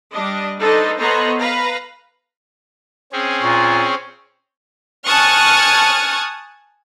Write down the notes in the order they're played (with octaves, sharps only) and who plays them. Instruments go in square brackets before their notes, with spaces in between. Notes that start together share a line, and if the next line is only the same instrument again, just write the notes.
[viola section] G3 D4 D#5
D4 D#4 A4 B4 C5 D#5
B3 A4 C5 C#5 D#5 A#5
B4 F5 A#5
[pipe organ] C4 C#4 G#4
[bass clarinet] A#2 [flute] C#6
[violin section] G#5 A5 C#6 D#6 F6 F#6